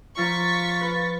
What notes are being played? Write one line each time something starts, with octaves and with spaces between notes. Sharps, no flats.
F3 F4 A#5 C#6 A6 B6
B4